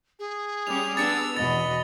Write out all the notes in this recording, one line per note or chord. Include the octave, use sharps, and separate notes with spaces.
G#4
G3 C#4 G4 F7
B3 D4 E6 A6 C#7
E2 B2 D#5 B5 A6